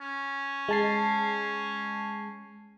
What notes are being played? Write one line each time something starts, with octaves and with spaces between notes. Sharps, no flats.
C#4
G#3 A5 C7